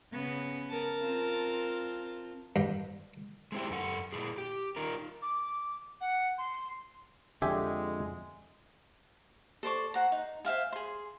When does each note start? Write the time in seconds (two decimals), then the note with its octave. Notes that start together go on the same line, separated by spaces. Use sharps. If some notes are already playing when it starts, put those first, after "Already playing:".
0.13 C#3 B3
0.70 A#4 A5
1.02 C4 F4
2.56 G2
3.52 G#3 C4 E4 G4
3.71 F#2 A4 F#5
4.13 A#2 E4 G#4
4.38 G4
4.76 D#4 F4 A#4
5.22 D6
6.01 F#5
6.38 C6
7.42 F2 D3 G#3 G4 E5 G#5
9.63 A4 C5 D5 C#6
9.94 C5 F#5 A#5
10.12 D#4
10.45 C5 E5 F5 G#5
10.72 G#4 C6